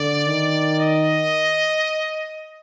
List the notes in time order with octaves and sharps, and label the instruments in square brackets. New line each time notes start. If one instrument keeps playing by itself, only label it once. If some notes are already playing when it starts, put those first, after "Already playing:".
Already playing: [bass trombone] D3 [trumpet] D5
[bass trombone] D#3
[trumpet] D#5